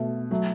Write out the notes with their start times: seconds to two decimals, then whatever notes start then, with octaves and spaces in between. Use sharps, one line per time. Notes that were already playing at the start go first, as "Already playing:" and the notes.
Already playing: B2 A3
0.31 F#3 A3